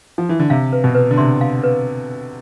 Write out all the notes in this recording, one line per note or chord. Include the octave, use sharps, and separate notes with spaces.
F3
E3
D3
C3 F5
B4
B2
B4
D3
C3 C6
F5
B4